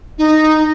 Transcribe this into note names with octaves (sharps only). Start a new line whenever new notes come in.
D#4